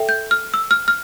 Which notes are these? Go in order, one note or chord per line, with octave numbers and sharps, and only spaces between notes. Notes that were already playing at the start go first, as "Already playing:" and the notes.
Already playing: A4 E5 G5
G6
F6
E6
F6
F6